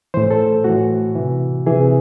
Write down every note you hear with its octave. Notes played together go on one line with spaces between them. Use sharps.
A2 E3 C5
A4
A2 E3 F#4
C3 E3
C3 E3 G#4